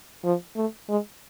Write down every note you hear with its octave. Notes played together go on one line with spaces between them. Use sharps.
F3
A3
G#3